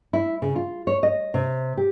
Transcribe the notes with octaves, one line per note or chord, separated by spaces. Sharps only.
E4
C#3
F4
C#5
D#5
C3
G4